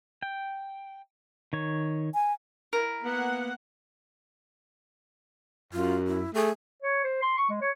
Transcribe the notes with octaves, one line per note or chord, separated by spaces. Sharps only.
G5
D#3 C#5
G#5
E4 A#4
A#3 B3 F#5
F#2 F4
E4
A3 G#4
C#5
C5
C6
C#6
G#3
C#5